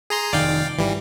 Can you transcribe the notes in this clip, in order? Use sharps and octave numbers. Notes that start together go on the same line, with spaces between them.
G#4 A#5 C6
F1 D#3 D5 F5 G5
G#1 E3 G3